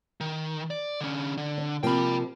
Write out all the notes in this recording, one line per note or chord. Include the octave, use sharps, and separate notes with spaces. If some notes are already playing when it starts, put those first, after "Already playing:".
D#3
D5
D3 C#4
D3
D4
C3 F3 A#3 G5 B5